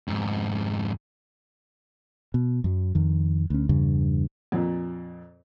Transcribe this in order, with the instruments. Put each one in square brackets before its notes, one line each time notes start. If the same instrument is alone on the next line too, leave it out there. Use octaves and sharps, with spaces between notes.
[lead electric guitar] F2 G#2
[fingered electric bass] B2
F#2 F#3
F2 D#3
D2 C#4
E2 G2 C#3
[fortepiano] F2 A#2